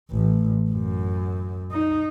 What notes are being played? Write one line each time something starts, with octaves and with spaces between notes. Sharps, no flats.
A1
F#2
D#4